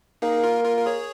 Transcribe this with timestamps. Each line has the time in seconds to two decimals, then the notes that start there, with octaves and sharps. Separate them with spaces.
0.22 A#3 D#4 G#4
0.43 F4 A#4
0.65 F4 A#4
0.78 A#4
0.86 G#4 C#5